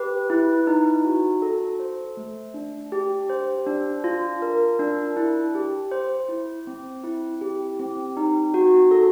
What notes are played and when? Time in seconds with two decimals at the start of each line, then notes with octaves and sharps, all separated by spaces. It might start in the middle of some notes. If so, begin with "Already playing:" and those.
Already playing: G4 B4
0.30 E4
0.67 D#4
1.05 F#4
1.42 A4
1.80 C5
2.17 A3
2.54 D4
2.92 G4
3.30 C5
3.66 D4
4.04 F4
4.42 A#4
4.79 D4
5.17 E4
5.55 G4
5.91 C5
6.29 E4
6.67 C4
7.04 E4
7.41 G4
7.79 C4
8.17 D#4
8.54 F#4
8.91 A4